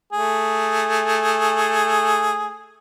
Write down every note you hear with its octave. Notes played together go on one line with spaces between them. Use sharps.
A3 G#4